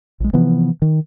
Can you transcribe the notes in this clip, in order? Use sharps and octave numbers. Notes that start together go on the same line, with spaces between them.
A#1 G#3
C3 E3 F3 B3
D#3